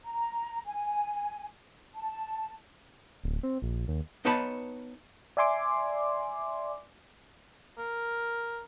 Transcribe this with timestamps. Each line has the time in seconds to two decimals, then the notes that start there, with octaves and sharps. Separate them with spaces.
0.04 A#5
0.66 G#5
1.95 A5
3.23 D1
3.43 C4
3.62 A#1
3.88 D#2
4.25 B3 D#4 B4 C#5 A5 B5
5.37 D5 E5 G#5 C6 D6
7.78 A#4